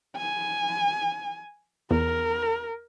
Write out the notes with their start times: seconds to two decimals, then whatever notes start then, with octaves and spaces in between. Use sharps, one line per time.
0.16 G#5
1.91 E2 A#4